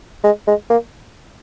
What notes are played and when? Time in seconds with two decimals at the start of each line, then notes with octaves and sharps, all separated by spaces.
0.24 G#3
0.47 G#3
0.70 A#3